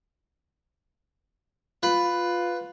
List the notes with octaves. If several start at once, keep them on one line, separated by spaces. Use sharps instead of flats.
F4 B4